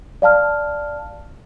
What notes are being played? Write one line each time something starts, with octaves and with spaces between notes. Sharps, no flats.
D5 F5 A5 F6